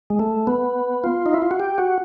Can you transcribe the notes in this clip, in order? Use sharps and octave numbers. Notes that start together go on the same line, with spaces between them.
G#3
A3
B3
F4
D#4
E4
F4
F#4
G4
F#4